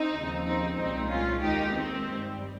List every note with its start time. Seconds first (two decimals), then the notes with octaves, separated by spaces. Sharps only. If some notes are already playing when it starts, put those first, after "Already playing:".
Already playing: C4 D#4
0.14 D#2 C#3 F3
0.45 C4 D#4
0.77 C2 A#2 G#3 C4 D#4
1.09 C#4 F4
1.41 D#2 D#3 G#3 D#4 G4
1.72 C4
2.04 G2 G3